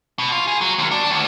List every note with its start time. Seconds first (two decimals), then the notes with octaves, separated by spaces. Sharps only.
0.19 B2
0.32 F4
0.48 G#4
0.61 F#3
0.79 D#2
0.91 D4
1.11 D2